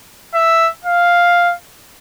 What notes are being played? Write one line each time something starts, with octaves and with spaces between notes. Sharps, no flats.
E5
F5